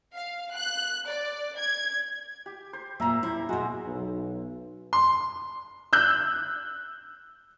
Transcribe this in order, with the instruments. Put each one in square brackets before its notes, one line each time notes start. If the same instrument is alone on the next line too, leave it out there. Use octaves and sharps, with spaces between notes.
[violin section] F5
F#6
D5
G#6
[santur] G4
C5
[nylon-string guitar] A#2 A#3 [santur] E5 A#5
[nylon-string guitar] E4 [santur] C5
[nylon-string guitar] B2 F#4 [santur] G#3
[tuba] B1
[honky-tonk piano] C6
E6 F#6 G6